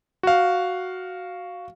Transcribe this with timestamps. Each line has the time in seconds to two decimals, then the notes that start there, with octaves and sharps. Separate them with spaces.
0.23 F#4 F5